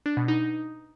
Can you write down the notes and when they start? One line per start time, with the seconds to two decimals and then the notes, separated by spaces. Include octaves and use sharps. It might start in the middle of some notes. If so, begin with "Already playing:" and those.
0.06 D4
0.17 B2
0.28 D#4